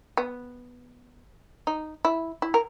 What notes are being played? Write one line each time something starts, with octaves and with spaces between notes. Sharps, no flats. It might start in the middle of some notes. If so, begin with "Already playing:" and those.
B3
D#4
E4
E4
A#4